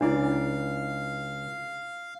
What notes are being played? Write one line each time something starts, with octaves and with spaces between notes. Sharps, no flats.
C#2 D4 E4 D5 F5